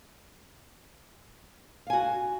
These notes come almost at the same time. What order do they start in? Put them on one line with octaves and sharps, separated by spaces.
F5 G#5 F#4